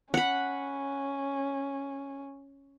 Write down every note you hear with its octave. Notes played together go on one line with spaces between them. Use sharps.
C#4 F#5 B5